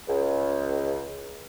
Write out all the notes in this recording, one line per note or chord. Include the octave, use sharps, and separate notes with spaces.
C#2